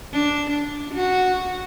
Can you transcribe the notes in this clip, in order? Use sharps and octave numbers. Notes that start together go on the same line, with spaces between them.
D4
D4
F#4